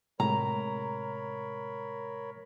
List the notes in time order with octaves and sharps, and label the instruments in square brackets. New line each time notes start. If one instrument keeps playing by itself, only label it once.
[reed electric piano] A2 C3 G#3 [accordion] A#4 C#5 B5 [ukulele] A#5